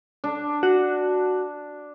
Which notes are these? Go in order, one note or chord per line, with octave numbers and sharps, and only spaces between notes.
D4
F#4